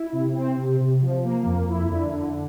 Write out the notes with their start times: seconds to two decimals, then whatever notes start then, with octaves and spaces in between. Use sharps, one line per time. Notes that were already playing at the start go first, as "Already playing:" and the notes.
Already playing: E4
0.13 C3
0.35 C4
0.57 C3
0.80 C3
1.02 F3
1.24 A#3
1.46 F2
1.68 E4
1.90 D3
2.12 D3